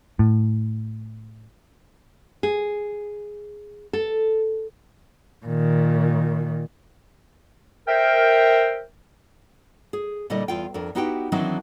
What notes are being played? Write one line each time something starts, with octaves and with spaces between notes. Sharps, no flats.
A2
G#4
A4
A#2 D#3
A#4 C5 E5 G5
G#4
A#2 D3 G3 E4 D#5
E2 F4 G5
F2 D4 A#4
B3 D#4 E4 F#4 G4 G5
D#3 E3 F#3 C4 D4 D#4